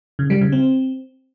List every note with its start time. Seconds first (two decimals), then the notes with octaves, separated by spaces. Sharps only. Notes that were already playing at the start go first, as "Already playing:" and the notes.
0.19 C#3
0.30 G3
0.41 C#3
0.52 C4